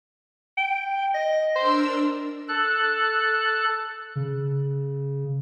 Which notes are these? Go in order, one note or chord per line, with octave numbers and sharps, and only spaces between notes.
G5
D#5
D4 A#4 C5 E6
A4 F#6
C#3